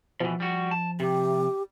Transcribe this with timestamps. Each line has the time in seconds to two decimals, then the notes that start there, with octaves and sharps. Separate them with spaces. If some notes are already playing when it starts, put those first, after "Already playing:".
0.20 B2 E3 F3
0.40 G3 F#4
0.71 A5
1.00 C3 G4